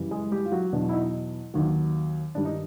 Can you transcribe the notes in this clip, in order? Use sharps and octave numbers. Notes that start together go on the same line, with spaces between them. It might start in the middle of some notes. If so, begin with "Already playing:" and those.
Already playing: F#2 C#3 E3 G3
G#3 G#4
G3 G4
F4
F#3 F#4
E2 B2 F#3 D4
E4
D#4
D#2 D#3 F#3
G2 D#3 G3 D4
D#4